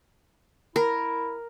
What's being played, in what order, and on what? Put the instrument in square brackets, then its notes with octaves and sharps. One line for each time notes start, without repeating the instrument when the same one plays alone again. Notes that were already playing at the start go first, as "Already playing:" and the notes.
[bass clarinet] E4 [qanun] A#4